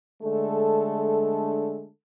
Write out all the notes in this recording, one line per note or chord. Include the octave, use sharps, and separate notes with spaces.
D3 G#3 A3 D4 A4